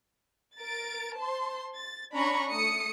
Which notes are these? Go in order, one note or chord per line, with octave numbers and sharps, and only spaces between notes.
A#4 A6 D7
C5 A5 C6
A6
C#4 D4 A#5 B5 C#6
A3 D#6 C#7